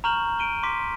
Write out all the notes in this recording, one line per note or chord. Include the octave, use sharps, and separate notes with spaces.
A#5 C#6 F6 G6 E7 F#7
D7 D#7 G7
C6 D6 B6